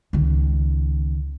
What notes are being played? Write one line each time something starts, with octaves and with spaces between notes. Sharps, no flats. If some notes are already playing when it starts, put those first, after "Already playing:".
C#2 D#3